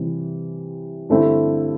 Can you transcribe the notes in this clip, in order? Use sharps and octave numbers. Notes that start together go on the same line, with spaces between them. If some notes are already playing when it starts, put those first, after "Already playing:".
Already playing: C3 E3 G3
G2 D3 A3 C4 E4